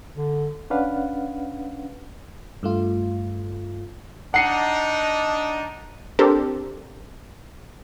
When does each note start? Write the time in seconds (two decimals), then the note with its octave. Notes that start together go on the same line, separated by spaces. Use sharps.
0.15 D3
0.70 C#4 D4 B4 F5 F#5
2.63 G2 A3 F4
4.34 D4 D#4 F#5 C7 C#7
6.19 C4 D4 G4 A4 A#4 C5